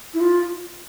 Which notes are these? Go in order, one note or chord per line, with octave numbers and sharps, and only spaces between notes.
E4
F4